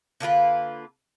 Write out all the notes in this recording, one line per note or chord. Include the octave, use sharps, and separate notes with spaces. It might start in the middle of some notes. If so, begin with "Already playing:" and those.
D3 A#3 F4 B4